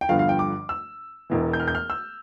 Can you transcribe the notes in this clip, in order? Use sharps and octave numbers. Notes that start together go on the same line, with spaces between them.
G5
G1 G2 D3 F3 F5
F5
G5
D6
E6
E1 E2 E3
G6
F6
G6
F6
E6